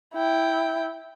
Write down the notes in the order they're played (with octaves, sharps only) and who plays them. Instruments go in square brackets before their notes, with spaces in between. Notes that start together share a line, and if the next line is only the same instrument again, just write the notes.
[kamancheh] E4 G5